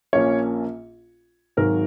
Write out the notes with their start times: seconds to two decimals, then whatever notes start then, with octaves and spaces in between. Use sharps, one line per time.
0.13 A#1 A#2 A#3 C#4 C#5
1.57 G#1 G#2 D#3 F#3 A#4